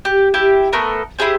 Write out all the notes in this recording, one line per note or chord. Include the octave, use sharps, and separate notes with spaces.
G4
E4 G4 E5
A3 B3 A4 A#4
E4 G4 G#4 C5